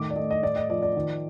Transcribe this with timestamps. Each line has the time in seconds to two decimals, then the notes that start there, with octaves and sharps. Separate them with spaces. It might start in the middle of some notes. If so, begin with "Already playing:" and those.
Already playing: A2 D#3 A3 D6
0.10 D5
0.16 A3 D#5
0.31 D#5
0.42 A2 D5
0.56 D#5
0.70 F3 D5
0.82 D5
0.96 D#3